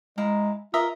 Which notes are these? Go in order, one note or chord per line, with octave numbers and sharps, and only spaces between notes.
G#3 E4 F5 A#5
F4 A#4 D#5 E5